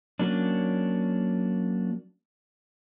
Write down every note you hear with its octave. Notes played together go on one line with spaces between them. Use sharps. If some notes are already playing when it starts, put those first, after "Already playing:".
F#3 A#3 C#4 D4